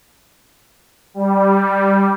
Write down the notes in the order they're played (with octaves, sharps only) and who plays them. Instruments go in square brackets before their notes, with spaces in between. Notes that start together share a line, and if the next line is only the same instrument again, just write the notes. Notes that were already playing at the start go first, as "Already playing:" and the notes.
[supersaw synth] G3